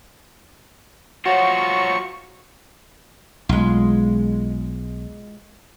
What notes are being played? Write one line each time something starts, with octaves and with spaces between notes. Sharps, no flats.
F#3 F4 F#4 C5 C#5 F#5 C#6
B1 G#3 F4